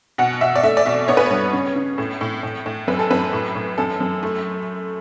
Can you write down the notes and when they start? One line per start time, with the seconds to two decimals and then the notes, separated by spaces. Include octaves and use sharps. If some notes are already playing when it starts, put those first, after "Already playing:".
0.18 B2 F#5
0.41 B2 E5
0.56 D5
0.63 A3 E5
0.77 D5
0.86 B2 E5
1.08 B3 C#5
1.17 B4
1.26 C#5
1.31 G2
1.53 C#3
1.76 C#3
1.98 A2
2.21 A2
2.43 A2
2.66 A2
2.88 F#2 B4
2.99 A4
3.10 F#2 B4
3.33 A2
3.55 A2
3.78 F#2 A4
4.00 F#2
4.23 A3